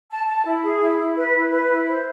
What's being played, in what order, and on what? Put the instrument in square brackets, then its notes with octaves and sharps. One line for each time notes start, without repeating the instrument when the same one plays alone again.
[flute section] A5
A5
E4
G#4
E4
E4
B4
E4
B4
E4
C5